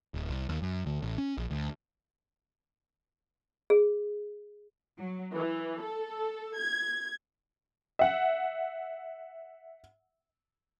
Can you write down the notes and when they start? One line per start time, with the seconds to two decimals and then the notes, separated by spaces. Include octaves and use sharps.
0.14 D1
0.30 C2
0.49 D#2
0.62 F#2
0.86 D2
1.03 A1
1.18 C#4
1.38 A#1
1.51 D2
3.70 G#4
4.98 F#3
5.34 E3
5.82 A4
6.58 G#6
7.99 E5 F#5